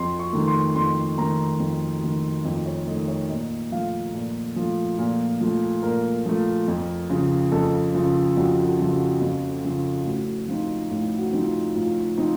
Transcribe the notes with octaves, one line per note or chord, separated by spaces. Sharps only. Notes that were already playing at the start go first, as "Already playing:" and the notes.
Already playing: F2 C6
C#6
D#3 A3
C6
F2 C6
D#3 A3 A#5
F2
D#3 A3
F2
C#5
D#3 A3 D#5
C#5
A#2 D#5
F3 A3 F5
A#2
F3 A3
A#2
F3 A3
A#2 A#4
F3 A3
F2
C#3 F3
F2 A4
C#3 F3
F2 F#4
F#4
C#3 F3
F#4
F2
C#3 F3
A2 F#4
F3 C4 D#4 F4
A2 F4
F#4
F3 C4 D#4
A2 F4
F3 C4 D#4